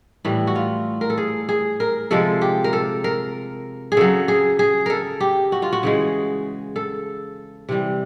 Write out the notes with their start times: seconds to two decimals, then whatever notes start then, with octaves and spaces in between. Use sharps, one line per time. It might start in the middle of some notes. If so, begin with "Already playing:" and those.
0.25 A2 E3 G3 E4
0.47 F#4
0.55 F4
1.01 A#4
1.10 A4
1.18 G#4
1.49 G#4
1.80 A#4
2.11 C3 F3 G#3 A4
2.41 G4
2.64 A#4
2.73 A4
3.04 A#4
3.92 G#4
3.97 C#3 F#3 A4
4.28 G#4
4.59 G#4
4.86 A4 A#4
5.20 G4
5.52 F#4
5.62 F4
5.73 F#4
5.83 C#3 E3 G#3
6.76 A4
7.69 C3 E3 G3